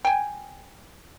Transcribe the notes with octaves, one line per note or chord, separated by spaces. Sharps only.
G5 G#5